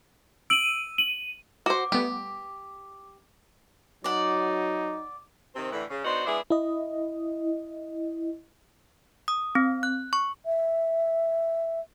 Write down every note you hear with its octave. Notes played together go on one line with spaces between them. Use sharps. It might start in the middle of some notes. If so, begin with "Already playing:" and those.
E6 D7 D#7 F#7
D#7 F#7
F#4 C5 D6
G3 A3 B3 G4
F#3 D#4 D5 F#5
C3 D#3 C4
A2 D3 E3
C#3
B3 D4 D#4 F#4 C5
G#3 B3 D4 E4 G#4
E4 D#5
D#6
C4
F#6
C#6
E5